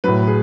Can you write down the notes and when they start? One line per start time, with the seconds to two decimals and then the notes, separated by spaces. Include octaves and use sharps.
0.04 A2 F#3 B4
0.27 G#4